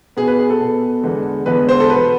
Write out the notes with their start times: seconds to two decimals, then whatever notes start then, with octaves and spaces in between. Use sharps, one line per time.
0.17 B2 B3 G#4
0.27 B4
0.39 G#4
0.50 A4
0.60 B2 B3
1.03 E2 D3 G#3 B3
1.46 E2 D3 G#3 B3 B4
1.69 C5
1.80 A4
1.90 B2 B3 B4